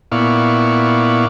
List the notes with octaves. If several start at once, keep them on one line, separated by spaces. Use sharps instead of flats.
A#2 B3 E4 D5 F5 C#6